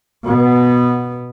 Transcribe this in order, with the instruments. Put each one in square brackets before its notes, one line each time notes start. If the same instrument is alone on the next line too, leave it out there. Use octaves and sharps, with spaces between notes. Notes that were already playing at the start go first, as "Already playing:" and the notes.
[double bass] B2 B3